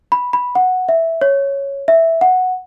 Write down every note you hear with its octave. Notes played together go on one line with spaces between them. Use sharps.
B5
B5
F#5
E5
C#5
E5
F#5